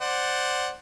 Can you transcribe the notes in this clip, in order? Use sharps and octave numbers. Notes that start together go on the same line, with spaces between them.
C5 D5 F#5